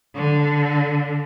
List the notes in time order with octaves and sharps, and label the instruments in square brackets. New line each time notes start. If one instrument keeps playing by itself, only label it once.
[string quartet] D3